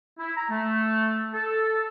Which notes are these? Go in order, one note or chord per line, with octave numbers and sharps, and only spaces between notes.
E4
A#5
A3
A4